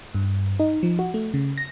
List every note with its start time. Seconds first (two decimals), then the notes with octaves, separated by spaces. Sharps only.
0.15 G2
0.60 D#4
0.83 F3
0.99 F#4
1.14 A3
1.34 C#3
1.58 A#6